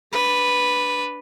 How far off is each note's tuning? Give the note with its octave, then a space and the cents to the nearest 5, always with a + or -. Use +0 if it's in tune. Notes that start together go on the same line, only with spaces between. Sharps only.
D4 +0 B4 +0